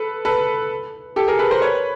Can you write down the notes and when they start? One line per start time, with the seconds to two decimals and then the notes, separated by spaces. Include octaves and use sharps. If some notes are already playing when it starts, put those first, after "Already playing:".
Already playing: A4 B4
0.25 A4 B4
1.16 G4 A4
1.28 G#4 A#4
1.39 A4 B4
1.51 A#4 C5
1.62 B4 C#5